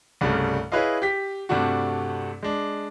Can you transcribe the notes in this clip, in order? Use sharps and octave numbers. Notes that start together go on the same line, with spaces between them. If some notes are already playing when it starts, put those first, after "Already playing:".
C2 G2 C#3 G3 A3
E4 G#4 B4 C#5 D#5 F5
G4 B6
G2 C3 G3 A3 D4 F#4
G#3 D4